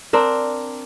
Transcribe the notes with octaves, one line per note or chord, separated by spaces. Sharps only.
C4 D4 A#4